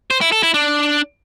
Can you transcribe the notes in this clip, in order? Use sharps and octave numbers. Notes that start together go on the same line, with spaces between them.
C5
E4
A4
E4
D4